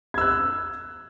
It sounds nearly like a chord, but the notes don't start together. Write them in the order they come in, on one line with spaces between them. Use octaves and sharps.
G#6 E6 F#6